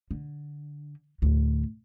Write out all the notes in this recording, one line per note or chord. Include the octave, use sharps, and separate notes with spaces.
D3
D2 A2